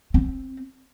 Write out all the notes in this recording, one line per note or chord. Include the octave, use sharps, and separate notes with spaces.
C4